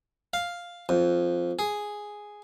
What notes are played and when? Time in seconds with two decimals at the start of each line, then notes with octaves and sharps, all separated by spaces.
0.33 F5
0.89 F2
1.59 G#4